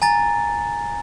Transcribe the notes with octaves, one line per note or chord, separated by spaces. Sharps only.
G#5 A#5 A6